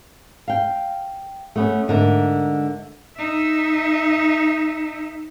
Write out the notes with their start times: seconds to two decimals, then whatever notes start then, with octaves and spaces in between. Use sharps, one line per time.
0.48 F5 G5
1.56 A3 B3 C#4
1.88 G#2 D3 A#4 E5
3.18 D#4 E5